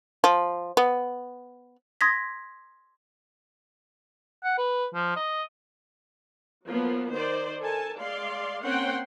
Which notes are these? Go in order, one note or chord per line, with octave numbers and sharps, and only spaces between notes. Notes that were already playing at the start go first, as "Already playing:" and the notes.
F3
B3
C6 D#6 G#6 A#6 B6
F#5
B4
F3
D#5
F3 F#3 A#3 B3
D#3 C5 D5
A4 A#4 G#5 A5
G#3 D5 F5 C6
A#3 C4 C#4 F#5 G5 C6